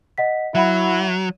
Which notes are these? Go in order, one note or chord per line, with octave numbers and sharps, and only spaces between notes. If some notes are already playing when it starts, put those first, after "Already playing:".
D#5 F#5 B6
F#3 E4 E5 F#5 B5